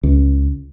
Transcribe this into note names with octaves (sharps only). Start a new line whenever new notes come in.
C#2